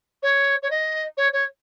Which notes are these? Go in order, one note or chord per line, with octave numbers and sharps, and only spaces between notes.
C#5
C#5
D#5
C#5
C#5